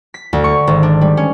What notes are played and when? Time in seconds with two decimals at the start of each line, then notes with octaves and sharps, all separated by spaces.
0.14 B6
0.33 D2
0.44 C#6
0.67 G#1
0.83 D4
1.01 G3
1.17 C#4